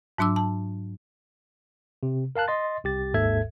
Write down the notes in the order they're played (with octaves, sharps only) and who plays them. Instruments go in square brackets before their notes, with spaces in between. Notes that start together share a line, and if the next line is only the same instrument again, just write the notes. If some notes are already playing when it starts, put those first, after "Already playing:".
[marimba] G#2 F#3 D4 D6 E6
A5
[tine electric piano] C3
A#4 F5 A5 F#6
D#5 C6 A6
C2 G4 A6
G#1 D#2 G#2 A4 E5 G#6